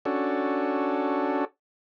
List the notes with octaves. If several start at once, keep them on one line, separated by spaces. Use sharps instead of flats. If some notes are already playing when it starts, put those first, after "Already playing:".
C#4 D4 F#4 A4